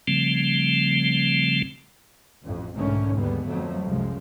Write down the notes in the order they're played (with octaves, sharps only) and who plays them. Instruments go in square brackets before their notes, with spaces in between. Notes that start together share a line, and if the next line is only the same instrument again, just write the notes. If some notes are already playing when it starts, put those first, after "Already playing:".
[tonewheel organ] C#3 F3 G3 A3 C4
[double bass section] A1 F2
B1 G#2 D3 D#3 A3 C#4
D#2 D3 G3 G#3 B3
F2 F#3 A3
C2 F#2 C#3 F3 G#3